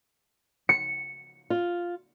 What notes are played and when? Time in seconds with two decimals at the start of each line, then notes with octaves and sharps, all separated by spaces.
0.69 C#7
1.50 F4